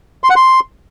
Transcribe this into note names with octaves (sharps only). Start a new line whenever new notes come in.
C6
F#5
C6